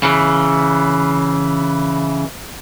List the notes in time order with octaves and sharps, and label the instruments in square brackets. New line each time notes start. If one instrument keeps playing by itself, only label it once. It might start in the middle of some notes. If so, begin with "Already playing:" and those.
[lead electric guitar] C#3 E3